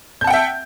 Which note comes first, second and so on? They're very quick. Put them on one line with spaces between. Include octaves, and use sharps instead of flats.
G6 A5 F#5 G5 E5